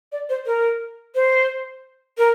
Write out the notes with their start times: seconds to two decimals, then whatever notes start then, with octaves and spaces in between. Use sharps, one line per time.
0.12 D5
0.29 C5
0.46 A#4
1.15 C5
2.18 A#4